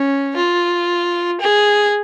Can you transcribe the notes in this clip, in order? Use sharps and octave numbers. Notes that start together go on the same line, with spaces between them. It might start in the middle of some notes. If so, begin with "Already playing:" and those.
Already playing: C#4
F4
G#4